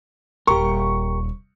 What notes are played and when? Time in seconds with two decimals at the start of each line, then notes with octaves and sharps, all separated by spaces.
0.47 D#1 G4 A#4 C#6